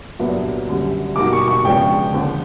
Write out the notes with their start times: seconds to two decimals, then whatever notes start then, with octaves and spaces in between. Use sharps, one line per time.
0.19 C2 A#2 F#3 B3 D4
0.68 F#2 D3 G3
1.16 B2 G3 A#3 D#4 F#4 D6
1.33 C#6
1.48 C#6
1.64 C#3 F3 G#3 B3 D4 G5
2.12 D#2 D3 F3